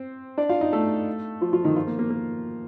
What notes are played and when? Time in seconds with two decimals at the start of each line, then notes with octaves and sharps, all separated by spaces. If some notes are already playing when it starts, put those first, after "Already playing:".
Already playing: C4 C5
0.38 D4 D5
0.49 F4 F5
0.61 D#4 D#5
0.73 A3 A4
1.41 F3 F4
1.53 F3 F4
1.64 D#3 D#4
1.76 F3 F4
1.87 A#3
1.99 A#3
2.10 A#3